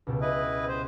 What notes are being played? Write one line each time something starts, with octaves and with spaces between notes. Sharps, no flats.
C#2 B2 G4
E4 B4 D#5
C5